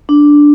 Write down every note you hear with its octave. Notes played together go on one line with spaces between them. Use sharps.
D4